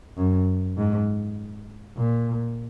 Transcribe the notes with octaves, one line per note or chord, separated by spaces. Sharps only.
F#2
G#2
A#2